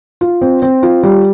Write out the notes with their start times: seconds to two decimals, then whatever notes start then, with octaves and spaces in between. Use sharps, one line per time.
0.21 F4
0.41 C4
0.62 C4
0.83 F4
1.03 G3